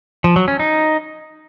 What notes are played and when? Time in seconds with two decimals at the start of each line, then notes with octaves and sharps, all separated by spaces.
0.24 F3
0.36 F#3
0.48 C#4
0.59 D#4